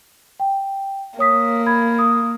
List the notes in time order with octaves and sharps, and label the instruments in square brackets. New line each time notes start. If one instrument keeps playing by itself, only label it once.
[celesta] G5
[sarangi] A#3 [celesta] C#5 D#6 B6
[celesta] B5 G#6
D#6